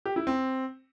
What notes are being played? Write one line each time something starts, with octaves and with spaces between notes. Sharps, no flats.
G4
E4
C4